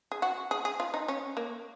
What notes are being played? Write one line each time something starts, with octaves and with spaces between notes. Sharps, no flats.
G#4
F#4
G#4
G#4
F4
D#4
C#4
A#3